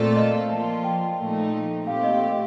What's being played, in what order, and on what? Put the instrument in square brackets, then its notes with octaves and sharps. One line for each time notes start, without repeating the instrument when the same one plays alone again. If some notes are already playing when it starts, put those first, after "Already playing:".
Already playing: [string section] A#2 A3 C4 F4 A4 [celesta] D5
[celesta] D#5
[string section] F3 A#3 F4 [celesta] A5
[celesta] G5
[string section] A#2 F3 A3 D#4
[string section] A#2 A3 C4 G4 [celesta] F5
[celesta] D#5
D#5